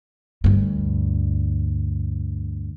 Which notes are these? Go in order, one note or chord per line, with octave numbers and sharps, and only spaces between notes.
D2 G2